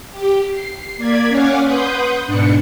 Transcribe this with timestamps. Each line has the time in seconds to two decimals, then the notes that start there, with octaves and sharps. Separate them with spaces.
0.11 G4
0.50 C7
0.97 A#3 D5 G#6 B6
1.28 C#4 C#5 F5 F#5 G#5 D6
1.64 B4 F#5 C6 D#6 G6
2.26 G#2 B2 D4 C#7